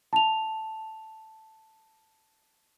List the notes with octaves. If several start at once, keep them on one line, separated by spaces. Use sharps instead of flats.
A5 F7